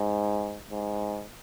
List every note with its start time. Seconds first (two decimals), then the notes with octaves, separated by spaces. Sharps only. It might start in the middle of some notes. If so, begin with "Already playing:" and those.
Already playing: G#2
0.70 G#2